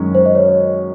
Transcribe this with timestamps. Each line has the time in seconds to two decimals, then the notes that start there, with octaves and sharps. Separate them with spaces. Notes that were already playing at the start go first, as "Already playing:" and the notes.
Already playing: F#2 D#3 G#3 C#4
0.15 C5
0.26 D#5
0.35 C#5